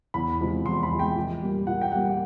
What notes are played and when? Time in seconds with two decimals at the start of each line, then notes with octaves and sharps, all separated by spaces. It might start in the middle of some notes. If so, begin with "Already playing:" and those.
0.14 E2 B5
0.40 C3 F3 G#3
0.65 E2 C6
0.83 B5
0.91 C3 F3 G#3
0.99 G5
1.16 A#2
1.42 G3 A#3
1.67 A#2 F#5
1.81 G5
1.92 G3 A#3 F#5